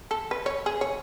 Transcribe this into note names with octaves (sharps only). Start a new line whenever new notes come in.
A4
B4
C#5
G#4
C#5